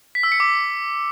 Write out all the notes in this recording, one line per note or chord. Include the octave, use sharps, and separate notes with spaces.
B6
E6
C#7
D6